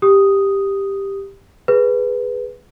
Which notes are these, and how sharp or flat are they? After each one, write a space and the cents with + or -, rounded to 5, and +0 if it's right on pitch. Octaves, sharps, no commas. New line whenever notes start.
G4 +5 D#6 +0
G#4 +0 B4 +0